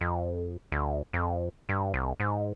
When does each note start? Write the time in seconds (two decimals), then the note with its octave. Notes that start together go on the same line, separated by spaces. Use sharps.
0.01 F2
0.72 D2
1.13 F2
1.69 G2
1.94 C2
2.20 G#2